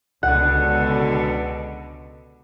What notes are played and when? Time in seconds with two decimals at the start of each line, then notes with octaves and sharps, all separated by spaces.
0.23 C#2 B2 D3 F#5